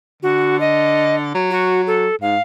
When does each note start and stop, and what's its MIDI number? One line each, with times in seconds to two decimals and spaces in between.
0.23 1.34 50
0.23 0.59 66
0.60 1.15 75
1.34 2.07 54
1.50 1.81 66
1.87 2.15 69
2.21 2.36 44
2.21 2.42 77